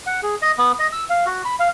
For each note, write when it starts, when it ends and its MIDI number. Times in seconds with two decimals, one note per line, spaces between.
0.06 0.21 78
0.23 0.35 68
0.42 0.52 75
0.58 0.72 59
0.79 0.87 75
0.92 1.05 88
1.10 1.25 77
1.26 1.42 66
1.45 1.56 83
1.60 1.68 77